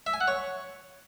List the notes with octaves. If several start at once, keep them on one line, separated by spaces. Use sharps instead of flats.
E5
G#5
F#5
C#5